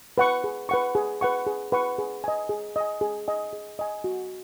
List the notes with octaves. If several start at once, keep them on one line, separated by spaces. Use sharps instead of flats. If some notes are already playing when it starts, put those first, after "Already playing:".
B4 F#5 C#6
G#4
B4 F#5 C#6
G#4
B4 F#5 C#6
G#4
B4 F#5 C#6
G#4
D#5 G#5
G#4
D#5 G#5
G#4
D#5 G#5
G#4
D#5 G#5
F#4